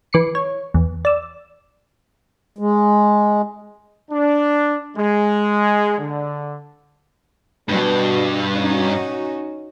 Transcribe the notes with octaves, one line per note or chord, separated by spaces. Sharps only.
E3 D6 C7 C#7
C#5
E2
D5 E6
G#3
D4
G#3
D3
G2 B2
C#4 D#4 F#4